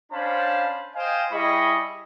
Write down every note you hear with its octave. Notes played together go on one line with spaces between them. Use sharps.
C#4 D4 C5 F5 A5 B5
C5 D#5 F5 G5 G#5
G3 E4 G#4 D#5 B5 C#6